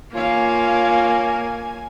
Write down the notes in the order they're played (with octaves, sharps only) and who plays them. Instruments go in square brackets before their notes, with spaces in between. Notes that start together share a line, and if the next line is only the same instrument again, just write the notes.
[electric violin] A#3 [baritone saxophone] F4 [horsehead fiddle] C#5 F5 [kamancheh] G#5